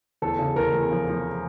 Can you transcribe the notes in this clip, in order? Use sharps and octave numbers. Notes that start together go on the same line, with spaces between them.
E2 A4
C#3
E2 A#4
E2
F3
F3